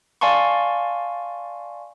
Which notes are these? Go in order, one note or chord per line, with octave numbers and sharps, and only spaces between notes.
D5 F5 G#5 A5 C6 C#6